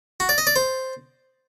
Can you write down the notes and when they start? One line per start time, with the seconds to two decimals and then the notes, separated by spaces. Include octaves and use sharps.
0.20 F#4
0.29 D5
0.38 D#5
0.47 D5
0.56 C5